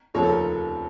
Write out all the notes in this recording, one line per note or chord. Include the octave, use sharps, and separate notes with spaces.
F1 D#2 C#3 F3 C4 C#5
A4
A#4